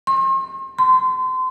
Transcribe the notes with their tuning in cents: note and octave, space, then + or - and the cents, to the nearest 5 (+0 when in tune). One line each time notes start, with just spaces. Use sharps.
C6 +40
C6 -30